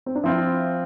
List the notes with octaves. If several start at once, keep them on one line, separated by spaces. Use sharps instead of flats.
C4
D4
F3 C4 E4 F4